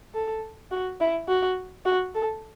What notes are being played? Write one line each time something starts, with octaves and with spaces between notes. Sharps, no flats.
A4
F#4
E4
F#4
F#4
A4